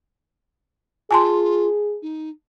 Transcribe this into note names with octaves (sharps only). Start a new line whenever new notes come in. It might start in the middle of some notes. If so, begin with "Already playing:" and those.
F4 G#4 G#5 A5 C6
D#4